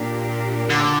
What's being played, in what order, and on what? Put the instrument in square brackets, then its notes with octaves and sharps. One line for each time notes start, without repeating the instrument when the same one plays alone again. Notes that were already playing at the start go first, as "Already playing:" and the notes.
Already playing: [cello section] A#2 A#3 D4 G4 A#4
[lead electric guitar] D3